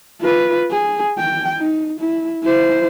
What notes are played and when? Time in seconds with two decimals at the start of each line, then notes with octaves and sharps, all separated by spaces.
0.21 F4 B4
0.71 G#4
1.18 G5
1.57 D#4
2.00 E4
2.43 E4 C5